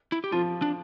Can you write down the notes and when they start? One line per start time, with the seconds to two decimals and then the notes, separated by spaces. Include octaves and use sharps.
0.12 E4
0.24 G4
0.32 F3 F4
0.62 D4